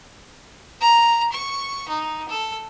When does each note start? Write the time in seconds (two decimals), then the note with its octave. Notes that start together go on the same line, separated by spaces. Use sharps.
0.81 A#5
1.32 C#6
1.89 D#4
2.29 A4